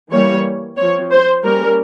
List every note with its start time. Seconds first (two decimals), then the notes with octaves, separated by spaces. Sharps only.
0.12 E3 G3 A#3 C#5
0.77 F3 C4 C#5
1.12 C5
1.44 G3 A#3 C#4 A#4